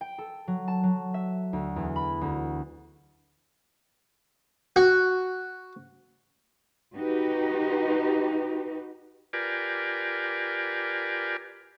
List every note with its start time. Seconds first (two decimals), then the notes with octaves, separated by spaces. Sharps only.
0.01 G5
0.18 A4
0.48 F#3
0.68 A5
0.83 F#3
1.14 E5
1.53 D2
1.76 E2
1.96 B5
2.21 D2
4.76 F#4
6.97 D#4 F#4 G4 B4
9.33 F4 G4 A#4 B4 D5 G#5